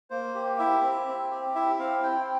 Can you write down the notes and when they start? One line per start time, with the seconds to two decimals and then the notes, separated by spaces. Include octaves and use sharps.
0.10 A#3 C5
0.35 G4
0.59 E4 E5
0.82 C4
1.07 C4
1.31 G4
1.55 E4 E5
1.79 C4 F5
2.03 C4 G5